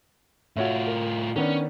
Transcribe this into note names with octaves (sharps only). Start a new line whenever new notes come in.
A2 F4 F#4 C#5 E5
A#4
D#3 B3 C#4 D4